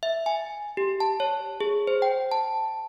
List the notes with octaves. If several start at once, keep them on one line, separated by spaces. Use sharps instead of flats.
E5
G#5
G4
A5
C#5
G#4
C5
G5
A5